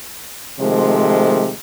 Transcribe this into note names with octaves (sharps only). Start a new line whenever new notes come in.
C3 D#3 F3 G#3 A3